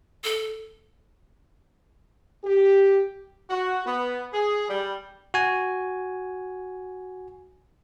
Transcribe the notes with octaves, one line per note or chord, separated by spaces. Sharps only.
A4
G4
F#4
B3
G#4
G3
F#4 G#5